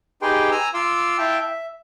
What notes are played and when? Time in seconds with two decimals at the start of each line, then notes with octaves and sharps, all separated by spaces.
0.22 D#4 G4 G#4 B4 G5 C6
0.51 G#5 A#5 E6
0.74 F4 F5 C6 D6 E6
1.18 E4 E5 F5 G5 A5
1.39 E5